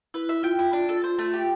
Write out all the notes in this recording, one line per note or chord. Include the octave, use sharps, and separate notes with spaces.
E4 B4
E5
F4 G5
E4
D4
A4
C5
A3
G4